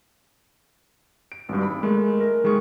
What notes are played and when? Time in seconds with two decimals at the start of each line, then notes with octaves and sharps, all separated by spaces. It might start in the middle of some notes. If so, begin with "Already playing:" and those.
1.32 D7
1.49 G#1 G2
1.63 B5
1.83 G#3 A3 A#4
2.21 A#4
2.44 D#3 G#3 G#4 C#6